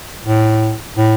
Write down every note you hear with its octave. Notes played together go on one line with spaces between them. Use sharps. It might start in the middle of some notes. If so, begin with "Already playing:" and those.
A2
A2